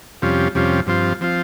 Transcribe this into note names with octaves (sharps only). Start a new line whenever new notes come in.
F2 C3 G3 C#4 F4
F2 C3 G3 C#4 F4
G2 F3 C4 F4
F3 C4 F4